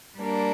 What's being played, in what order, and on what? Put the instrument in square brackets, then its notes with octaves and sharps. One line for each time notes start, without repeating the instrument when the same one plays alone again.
[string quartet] G3 A#3 D4